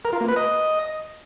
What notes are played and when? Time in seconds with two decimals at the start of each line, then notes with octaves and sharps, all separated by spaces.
0.05 A#4
0.13 F4
0.21 A#3
0.28 B4
0.36 D#5